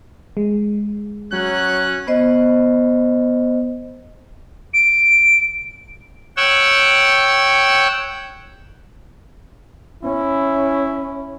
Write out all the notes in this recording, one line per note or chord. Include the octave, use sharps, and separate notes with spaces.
G#3
F#3 C#4 F#6
B3 C5 D#5
D7
C#5 F#5 G5 E6
C#4 E4